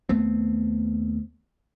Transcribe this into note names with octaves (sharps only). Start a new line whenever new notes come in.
D#2 A3 B3 C4